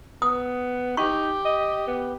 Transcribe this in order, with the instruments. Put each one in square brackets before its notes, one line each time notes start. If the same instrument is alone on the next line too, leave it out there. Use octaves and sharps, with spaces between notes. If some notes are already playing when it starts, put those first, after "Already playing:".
[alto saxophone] B3 [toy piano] D#6
[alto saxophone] D#4 [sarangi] G4 [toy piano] C#6
[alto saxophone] D#5
B3